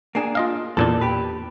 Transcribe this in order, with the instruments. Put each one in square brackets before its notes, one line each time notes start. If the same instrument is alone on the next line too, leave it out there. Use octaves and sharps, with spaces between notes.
[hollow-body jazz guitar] A#3 D4 G#4
[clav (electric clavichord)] F4 D#5 F5
[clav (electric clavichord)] E2 A#2 D4 [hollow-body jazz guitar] A4
[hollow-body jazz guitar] G4 B4